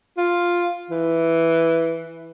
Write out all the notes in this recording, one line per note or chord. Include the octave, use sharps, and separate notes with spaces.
F4
E3